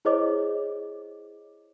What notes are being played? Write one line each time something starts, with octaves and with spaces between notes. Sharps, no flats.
E4 G#4 C5 C#5 D#5 D6